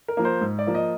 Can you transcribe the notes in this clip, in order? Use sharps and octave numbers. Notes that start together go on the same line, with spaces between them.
A#4
F3 A#3
C5
G#2
D5
F3 A#3
D#5